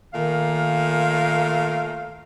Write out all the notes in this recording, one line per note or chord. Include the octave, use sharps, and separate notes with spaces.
A#2 D#3 A3 F5